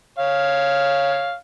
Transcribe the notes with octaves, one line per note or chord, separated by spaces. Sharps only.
C#5 F5